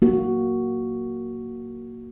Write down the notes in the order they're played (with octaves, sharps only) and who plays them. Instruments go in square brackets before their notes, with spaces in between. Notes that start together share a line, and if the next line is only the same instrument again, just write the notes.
[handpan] A#3 F#4